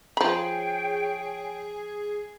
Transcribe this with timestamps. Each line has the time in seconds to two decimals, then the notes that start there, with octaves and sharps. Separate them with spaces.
0.17 F3 G#4 C#5 G5 B5